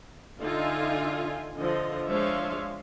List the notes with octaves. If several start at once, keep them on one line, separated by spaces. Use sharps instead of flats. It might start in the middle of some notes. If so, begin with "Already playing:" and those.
D3 D#4 F4 E5 F5 G#5
D3 F3 D#5
F3 G#3 D4 C#5 E5 F5